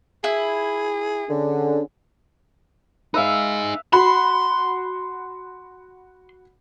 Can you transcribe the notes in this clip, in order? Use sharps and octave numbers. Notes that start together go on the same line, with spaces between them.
E4 G#4
D3 C#4 D4 G#4
D#4 G#4 B4 E5 F5
F#4 B5 C6